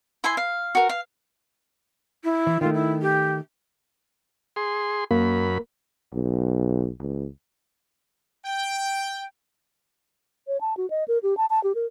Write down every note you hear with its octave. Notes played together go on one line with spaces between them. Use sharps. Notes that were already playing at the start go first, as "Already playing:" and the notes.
E4 E5 G#5 C6
F5
F#4 A#4
F5
E4
E3
D#3 A3 F4
E4
G4
G#4 C6
F#2 A#3 B5
B1
C#2
G5
C#5
A5
F#4
D#5
A#4
G4
A5
A5
G4
A#4